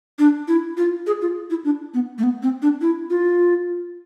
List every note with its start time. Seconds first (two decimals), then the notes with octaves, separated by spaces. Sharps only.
0.19 D4
0.48 E4
0.77 F4
1.07 G#4
1.22 F4
1.50 E4
1.65 D4
1.94 B3
2.18 A3
2.23 B3
2.43 C4
2.62 D4
2.81 E4
3.10 F4